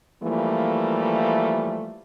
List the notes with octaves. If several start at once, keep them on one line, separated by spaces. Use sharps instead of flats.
E3 F3 G3 A3 A#3